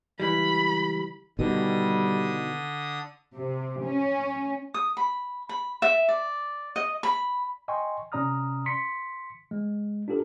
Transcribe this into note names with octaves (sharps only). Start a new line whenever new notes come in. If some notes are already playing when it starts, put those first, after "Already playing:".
C#2 E3 G3 B5
B2 D3 D#3 G3 D#6
C3
C#4
D#6
B5
B5
E5
D5
D#5
B5
D#5 G5 G#5 C6 C#6
C3 C#4 D5 A#5 D#6 F6
C6 B6 C#7
G#3
D4 F4 G4 A4 A#4